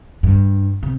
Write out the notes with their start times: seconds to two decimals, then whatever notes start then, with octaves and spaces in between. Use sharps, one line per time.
0.23 G2
0.83 C3